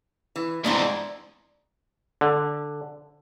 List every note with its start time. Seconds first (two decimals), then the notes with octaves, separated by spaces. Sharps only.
0.36 E3
0.65 E2 G#2 C3 E3 F3 G#3 D4 A#5
2.21 D3